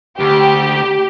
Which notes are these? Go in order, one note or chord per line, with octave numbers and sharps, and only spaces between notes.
D2 G4